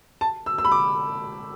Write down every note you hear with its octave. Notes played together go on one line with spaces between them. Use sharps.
A5
E6
E6
B5
D6